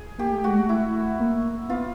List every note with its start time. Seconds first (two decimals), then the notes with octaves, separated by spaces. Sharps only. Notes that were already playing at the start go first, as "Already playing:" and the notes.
Already playing: G#4
0.18 A#3 G4
0.32 A3
0.44 G#3 F#4
0.59 A3
0.69 E4
1.20 A#3
1.69 B3 F4